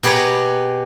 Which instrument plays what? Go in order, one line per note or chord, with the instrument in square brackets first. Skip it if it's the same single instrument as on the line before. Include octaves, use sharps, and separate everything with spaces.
[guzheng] B2 G4 G#4 B4 C#5 A#5